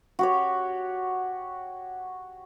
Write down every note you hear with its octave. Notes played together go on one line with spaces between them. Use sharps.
F#4 G4 C#5